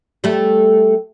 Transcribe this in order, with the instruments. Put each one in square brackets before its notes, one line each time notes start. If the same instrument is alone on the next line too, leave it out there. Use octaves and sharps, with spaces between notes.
[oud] G3 A3